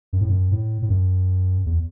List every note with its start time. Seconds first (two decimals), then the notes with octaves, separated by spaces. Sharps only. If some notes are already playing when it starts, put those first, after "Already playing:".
0.13 F#2
0.21 A2
0.30 F#2
0.51 A2
0.82 A2
0.89 F#2
1.66 E2